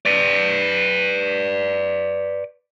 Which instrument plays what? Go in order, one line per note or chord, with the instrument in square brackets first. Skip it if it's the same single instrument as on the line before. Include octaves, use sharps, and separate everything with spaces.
[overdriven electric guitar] B4 D5